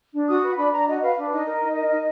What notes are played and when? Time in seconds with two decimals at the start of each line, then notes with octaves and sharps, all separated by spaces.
0.13 D4
0.29 F#4 D#6
0.43 B4
0.57 D4 B5
0.73 D4 A#5
0.87 F#4 D#5
1.02 B4 F5
1.17 D4
1.33 D#4 D#5
1.47 A#4
1.62 D#4
1.77 A#4
1.92 D#4